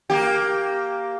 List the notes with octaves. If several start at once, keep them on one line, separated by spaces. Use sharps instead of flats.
A#3 G4